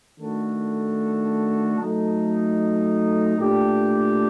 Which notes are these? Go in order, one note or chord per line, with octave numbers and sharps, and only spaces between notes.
D#3 A3 D4 F#4 A4
F#3 A3 D#4 A4
A#2 A3 D4 G4